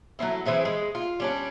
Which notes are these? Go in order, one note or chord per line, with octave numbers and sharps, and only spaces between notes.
F#3 A3 C4 E4
E3 C4 E4 G#4
G#3
F4
G3 C#4 D4